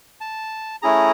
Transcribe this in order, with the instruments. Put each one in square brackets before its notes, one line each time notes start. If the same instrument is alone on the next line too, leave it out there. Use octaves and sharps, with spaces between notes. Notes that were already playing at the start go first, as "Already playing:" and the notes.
[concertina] A5
A3 C#4 E4 G#4 A#5